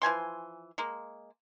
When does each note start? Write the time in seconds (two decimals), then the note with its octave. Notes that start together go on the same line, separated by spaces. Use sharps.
0.02 E3 F3 G#5 C6
0.78 G#3 A#3